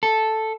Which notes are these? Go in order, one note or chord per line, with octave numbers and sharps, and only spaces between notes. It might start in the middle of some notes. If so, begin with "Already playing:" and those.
A4